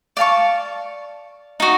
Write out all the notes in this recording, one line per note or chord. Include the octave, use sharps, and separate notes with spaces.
D5 F5 A5 C#6
D#4 F#4